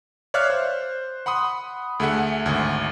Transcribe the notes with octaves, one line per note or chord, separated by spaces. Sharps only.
C#5 D5 E5 F5 F6 F#6
C5
F#5 B5 C6 D#6
D2 A3 G#4 E5 F#5
G#1 D2